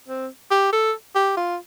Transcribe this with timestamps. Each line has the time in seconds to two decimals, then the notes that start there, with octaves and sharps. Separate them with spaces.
0.08 C4
0.51 G4
0.73 A4
1.15 G4
1.37 F4